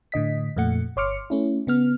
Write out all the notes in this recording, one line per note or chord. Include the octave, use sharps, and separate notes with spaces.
A2 D3 D#5 B6
F2 A#2 A3 F#5 C#7
G1 C#5 C6 D6 F6 C#7
A3 C#4 E4
C#3 B3 F6